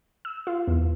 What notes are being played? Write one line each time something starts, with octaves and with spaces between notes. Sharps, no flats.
E6
F4
E2